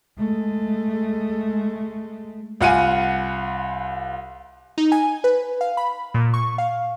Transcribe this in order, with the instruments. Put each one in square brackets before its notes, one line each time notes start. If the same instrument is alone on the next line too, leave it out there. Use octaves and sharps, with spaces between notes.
[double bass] G#3 A3
[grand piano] C2 F4 F#5 G#5 D#7
[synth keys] D#4
G#5
B4
F5
B5
A#2
C#6
F5